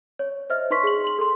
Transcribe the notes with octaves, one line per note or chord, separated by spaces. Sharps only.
C#5
C5 D#5 E5 F6
D#4 B4 C6 C#6 B6
G#4 F#7
C6 F#7
A4 C6